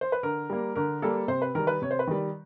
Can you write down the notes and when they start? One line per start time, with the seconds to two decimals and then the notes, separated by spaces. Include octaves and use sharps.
0.01 C5
0.12 B4
0.23 D3 A#4
0.50 G3 A#3
0.75 D3 A#4
1.02 G3 A#3 A4
1.28 C3 C5
1.42 B4
1.55 D#3 G3 A#4
1.67 B4
1.82 C3 C#5
1.91 C5
1.99 B4
2.07 D#3 G3